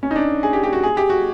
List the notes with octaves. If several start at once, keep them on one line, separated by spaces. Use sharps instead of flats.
C#4
D#4
D4
G#4
G4
G4
F#4
G#4
G4
F#4